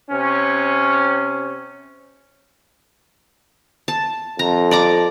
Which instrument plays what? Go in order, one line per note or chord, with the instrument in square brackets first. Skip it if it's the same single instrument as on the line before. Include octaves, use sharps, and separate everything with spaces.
[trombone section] C3 C#4
[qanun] A5
[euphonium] F2 [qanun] A#5
[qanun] D5 A#5 D6